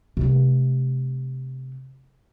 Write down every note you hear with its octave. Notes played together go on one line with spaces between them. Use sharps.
C3 A3